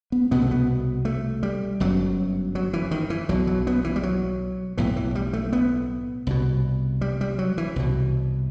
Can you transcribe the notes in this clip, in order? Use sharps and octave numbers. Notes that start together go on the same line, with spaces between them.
B3
C2 B2 B3
A3
B3
A3
G3
G1 F#2 F#3
F#3
E3
D#3
E3
B1 B2 F#3
F#3
B3
E3
G3
F#3
B1 A2 E3
E3
G3
A3
B3
C2 B2
G3
G3
F#3
E3
C2 B2